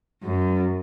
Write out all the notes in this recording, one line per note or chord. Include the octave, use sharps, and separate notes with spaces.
F#2